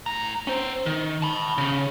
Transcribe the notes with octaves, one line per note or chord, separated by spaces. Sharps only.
A2 A#5
C#4 C5
D#3
A5 B5
C#3 C#4